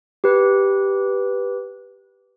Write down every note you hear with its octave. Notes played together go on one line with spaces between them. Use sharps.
G4 B4